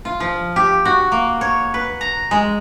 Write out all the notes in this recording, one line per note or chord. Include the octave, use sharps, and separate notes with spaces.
F4
F3
G4
F#4
A#3
C#5
B4
A#5
G#3